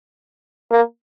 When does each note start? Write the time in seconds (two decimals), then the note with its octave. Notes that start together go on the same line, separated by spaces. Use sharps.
0.72 A#3